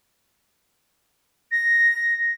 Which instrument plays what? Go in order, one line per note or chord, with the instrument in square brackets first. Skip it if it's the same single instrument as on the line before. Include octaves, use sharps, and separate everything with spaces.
[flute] A#6